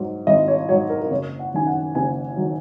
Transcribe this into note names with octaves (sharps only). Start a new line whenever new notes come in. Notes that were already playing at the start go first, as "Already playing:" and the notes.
Already playing: G#2 F#3
G#1 D#5
C#5
G#2 F#3 C#5
A#4
A#4
F#1 C#5
F#5
F#2 D#3 F#3 G#5
F#5
F#1 G#5
D#3 F#3